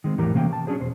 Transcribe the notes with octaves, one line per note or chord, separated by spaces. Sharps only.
D#3 G#3 C4
E2 A2 E3 G4 A#4 A#5
C3 E3 A#3 C#4 G5
A5
F#3 C#4 D4 G#4 C5
E2 B2 C5